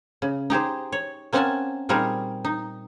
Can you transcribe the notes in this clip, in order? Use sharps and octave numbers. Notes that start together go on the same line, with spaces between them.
C#3
D#4 G4 G#4 C5
C#5
A#3 C4 C#4 F#5 G#5 A5
A#2 G3 C4 D#4 G#4 A#4
D#4